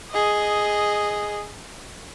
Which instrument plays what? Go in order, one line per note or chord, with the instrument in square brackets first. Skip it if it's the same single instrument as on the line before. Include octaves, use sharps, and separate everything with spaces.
[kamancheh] G#4 D#5